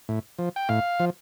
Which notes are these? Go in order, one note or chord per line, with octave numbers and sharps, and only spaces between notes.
A2
F3
G5
A2 F5
F3